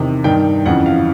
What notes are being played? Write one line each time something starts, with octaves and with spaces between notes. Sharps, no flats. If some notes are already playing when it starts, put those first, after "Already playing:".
Already playing: E2 C3 D#3
G2 D#3 G5
F2 C#3 E3 F#5
F5